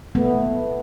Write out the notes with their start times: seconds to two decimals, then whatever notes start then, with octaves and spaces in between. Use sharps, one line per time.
0.15 A3 B3